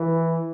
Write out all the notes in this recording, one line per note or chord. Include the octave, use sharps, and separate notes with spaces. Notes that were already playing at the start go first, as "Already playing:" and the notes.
Already playing: E3